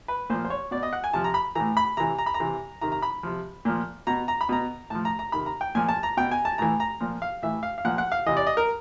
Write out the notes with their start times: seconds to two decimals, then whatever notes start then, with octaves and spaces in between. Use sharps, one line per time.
0.08 B4
0.30 A#2 F3 C5
0.45 C5
0.50 C#5
0.71 B2 D5
0.83 D#5
0.93 F#5
1.04 G#5
1.13 C3 F3 A5
1.24 A#5
1.34 B5
1.55 A2 E3 A#5
1.77 B5
1.97 C3 E3 A#5
2.19 A#5
2.26 B5
2.34 A#5
2.40 C3 E3
2.81 C3 D#3 A#5
2.92 A#5
3.02 B5
3.23 C3 F3
3.65 A#2 F3
4.07 B2 A#5
4.28 A#5
4.41 B5
4.49 B2 A#5
4.90 A2 F3 A5
5.05 A#5
5.19 A#5
5.32 C3 D#3 B5
5.46 A#5
5.61 G5
5.75 A#2 F3 G#5
5.89 A5
6.03 A#5
6.17 B2 G5
6.31 G#5
6.45 A5
6.58 A2 E3 A#5
6.80 A#5
7.00 A#2 F3
7.22 F5
7.42 A2 E3 E5
7.63 F5
7.78 F5
7.85 A#2 F3 F#5
7.98 F#5
8.12 F5
8.26 C3 E3 D#5
8.37 D5
8.47 D#5
8.57 A#4